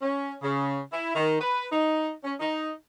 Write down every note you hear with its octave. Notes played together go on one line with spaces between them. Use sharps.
C#4
C#3
E4
D#3
B4
D#4
C#4
D#4